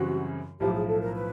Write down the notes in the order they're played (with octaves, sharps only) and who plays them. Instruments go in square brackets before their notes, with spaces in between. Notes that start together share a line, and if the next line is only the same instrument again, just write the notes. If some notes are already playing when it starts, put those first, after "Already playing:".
Already playing: [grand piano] F#2 C#3 E3 G3 C4 [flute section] F#4
[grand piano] B1 A2 F3 [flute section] G4
[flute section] G#4
A4
A#4
B4